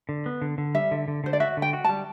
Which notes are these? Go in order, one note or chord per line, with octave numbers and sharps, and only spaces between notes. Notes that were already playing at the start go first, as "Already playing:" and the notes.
D3
B3
D3
D3
G3 E5
D3
D3
D3 C5
D5
F#4 E5
D3
G5
F#4
G3 A5